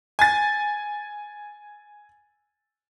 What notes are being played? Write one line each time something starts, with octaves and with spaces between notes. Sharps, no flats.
G#5 A6